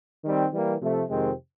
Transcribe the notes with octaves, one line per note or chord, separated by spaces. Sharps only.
D#3 G3 C4
E3 G3 A#3
C3 F3 A3
F2 C3 D#3 G#3 C4